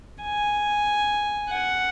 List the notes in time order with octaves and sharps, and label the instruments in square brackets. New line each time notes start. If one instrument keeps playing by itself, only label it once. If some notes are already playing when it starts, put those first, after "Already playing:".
[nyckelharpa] G#5
F#5